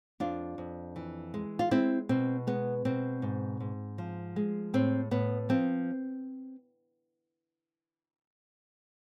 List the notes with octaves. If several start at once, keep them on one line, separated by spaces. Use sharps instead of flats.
F2 D4 F4
F2
E3
G#3
F4
G#3 C4 E4
B2 C4
G#3 B3
B2 C4
G#2
G#2
F3
G#3
A2 C4
A2 B3
F3 C4